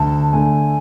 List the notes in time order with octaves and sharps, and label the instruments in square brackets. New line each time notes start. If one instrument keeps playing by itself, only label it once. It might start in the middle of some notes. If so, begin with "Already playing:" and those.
Already playing: [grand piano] D2 [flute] A5
[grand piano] D3 A3 [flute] G#5